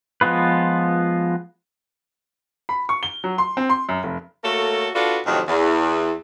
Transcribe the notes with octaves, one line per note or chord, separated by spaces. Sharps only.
F3 G#3 B3 F4 B4
B5
C#6
G7
F#3
C6
C4
C6
F#2
F1
A3 A#3 F#4 A4 C#5
D4 F4 F#4 A4 B4 D5
F2 A2 C3 D#3 F#3
E2